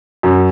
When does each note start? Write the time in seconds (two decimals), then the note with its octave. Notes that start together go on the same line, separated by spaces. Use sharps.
0.23 F#2